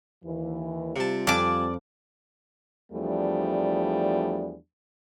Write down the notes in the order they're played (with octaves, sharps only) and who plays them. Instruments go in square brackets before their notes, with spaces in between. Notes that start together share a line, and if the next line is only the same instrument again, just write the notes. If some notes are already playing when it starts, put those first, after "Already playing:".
[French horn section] D#2 E3
[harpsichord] C3 A5 [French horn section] G3 C4 F4
[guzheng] F2 [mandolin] D5 D6 [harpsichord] G#5 A5
[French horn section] E2 F3 G3 A3 D4